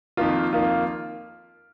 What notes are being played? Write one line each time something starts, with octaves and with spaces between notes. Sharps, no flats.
F2 D#3 A#3 F4
F2 D#3 A#3 F4